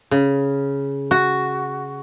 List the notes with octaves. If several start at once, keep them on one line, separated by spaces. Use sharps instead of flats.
C#3
F#4